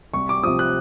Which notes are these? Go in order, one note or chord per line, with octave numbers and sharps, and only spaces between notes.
C2 C#6
D6
C3 F3 D#6
F#6